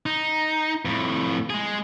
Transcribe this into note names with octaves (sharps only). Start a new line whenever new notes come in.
D#4
F2 A2
G#3 G#4